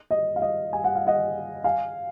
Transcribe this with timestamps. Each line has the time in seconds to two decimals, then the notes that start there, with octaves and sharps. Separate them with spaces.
0.11 D#5
0.36 F5
0.42 D#5
0.73 G#5
0.84 F#5
0.95 F5
1.07 D#5 F#5
1.64 F5 G#5